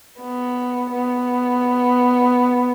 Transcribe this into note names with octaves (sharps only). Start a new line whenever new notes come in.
B3
B3